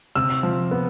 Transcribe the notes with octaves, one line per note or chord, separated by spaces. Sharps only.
C3 E6
F3
B3